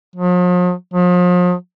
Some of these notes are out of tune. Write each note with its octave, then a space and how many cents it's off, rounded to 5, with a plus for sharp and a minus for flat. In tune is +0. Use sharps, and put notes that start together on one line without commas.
F3 +45
F3 +40